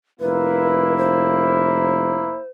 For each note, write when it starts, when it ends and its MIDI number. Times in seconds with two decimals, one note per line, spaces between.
0.20 2.35 29
0.20 2.41 58
0.20 2.41 64
0.20 0.95 71
0.98 2.48 72